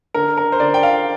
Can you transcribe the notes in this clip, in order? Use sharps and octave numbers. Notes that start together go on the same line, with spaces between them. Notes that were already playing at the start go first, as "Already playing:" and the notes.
D3 A#4
A#4
C5
D3 D5
G5
F5